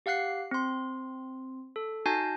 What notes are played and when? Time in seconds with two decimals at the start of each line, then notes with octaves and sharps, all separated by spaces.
0.06 G4 F5 F#5 F#6 C7
0.51 C4 C6
1.76 A4
2.06 D#4 F#4 G#5 A5 G6 A#6